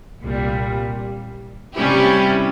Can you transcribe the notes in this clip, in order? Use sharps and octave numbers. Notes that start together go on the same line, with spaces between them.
C2 A#2 G3
C3 G3 C#4 E4 G4